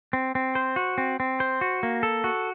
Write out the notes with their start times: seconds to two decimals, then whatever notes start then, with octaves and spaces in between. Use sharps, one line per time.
0.13 C4
0.35 C4
0.55 C5
0.76 F#4
0.98 C4
1.20 C4
1.40 C5
1.61 F#4
1.83 A#3
2.03 A4
2.24 F#4